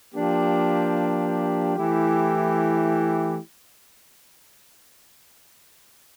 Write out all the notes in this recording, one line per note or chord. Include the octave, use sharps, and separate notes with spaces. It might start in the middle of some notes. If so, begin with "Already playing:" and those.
F3 A#3 D4 G4
E3 A3 E4 G4